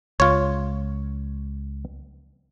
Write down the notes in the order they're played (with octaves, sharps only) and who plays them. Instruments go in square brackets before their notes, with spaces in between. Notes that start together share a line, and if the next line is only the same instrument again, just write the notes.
[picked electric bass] C#2 [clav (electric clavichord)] F4 C#5